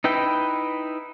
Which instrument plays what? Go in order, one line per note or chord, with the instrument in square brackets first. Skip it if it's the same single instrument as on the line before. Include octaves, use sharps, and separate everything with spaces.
[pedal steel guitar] D#4 E4 B4 G5